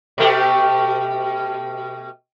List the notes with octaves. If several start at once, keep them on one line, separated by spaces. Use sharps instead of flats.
B2 A3 G4